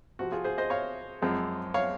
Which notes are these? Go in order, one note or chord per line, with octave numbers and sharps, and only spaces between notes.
C3 F3 C4 F#4
F4 G#4
G#4 C5
C5 D#5
C#5 F5
F#2 F3 G#3 C4
C#5 F5